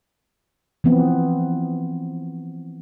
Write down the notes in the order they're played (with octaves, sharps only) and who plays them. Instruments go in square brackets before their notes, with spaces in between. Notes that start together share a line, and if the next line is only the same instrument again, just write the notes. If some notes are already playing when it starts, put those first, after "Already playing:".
[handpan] E3 F3 B3 C4